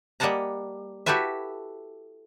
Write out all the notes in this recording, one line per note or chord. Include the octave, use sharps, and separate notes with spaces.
G3 A#3 D#5 F#5 A5 A#5
E4 F#4 G4 A4 B4 E5